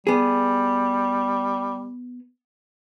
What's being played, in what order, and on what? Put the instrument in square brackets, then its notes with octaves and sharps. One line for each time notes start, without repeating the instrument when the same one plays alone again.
[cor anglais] G3 [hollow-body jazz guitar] B3 G#4